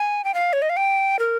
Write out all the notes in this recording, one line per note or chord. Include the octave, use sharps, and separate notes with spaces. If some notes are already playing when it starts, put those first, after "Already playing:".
Already playing: G#5
G5
F5
C#5
D#5
F5
G5
A#4